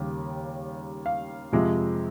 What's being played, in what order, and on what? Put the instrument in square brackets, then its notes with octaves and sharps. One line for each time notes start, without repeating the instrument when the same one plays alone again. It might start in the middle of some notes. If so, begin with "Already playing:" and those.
Already playing: [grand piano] D#2 C#3 G3
F5
F2 C3 F3 G#3